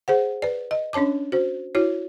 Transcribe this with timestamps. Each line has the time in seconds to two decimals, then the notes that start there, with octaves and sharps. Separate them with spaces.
0.08 G#4 C5 F#5
0.42 B4 D5
0.71 D#5
0.93 C#4 D4 C#5 A5 D6
1.32 F#4 C5
1.75 E4 F#4 C#5